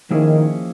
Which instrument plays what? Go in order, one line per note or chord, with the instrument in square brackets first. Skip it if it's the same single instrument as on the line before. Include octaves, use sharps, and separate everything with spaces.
[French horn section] D#3 [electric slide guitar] F3 A#3 C#4 E4 G#4